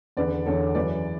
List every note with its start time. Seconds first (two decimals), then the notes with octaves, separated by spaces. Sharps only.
0.17 E2 D3 B4 D5
0.46 E2 D3 A4 C#5
0.75 F#2 E3 B4 D5